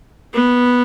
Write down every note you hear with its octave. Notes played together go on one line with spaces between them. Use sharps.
B3